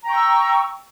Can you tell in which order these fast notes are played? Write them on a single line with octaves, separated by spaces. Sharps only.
A#5 G5 C#6 E6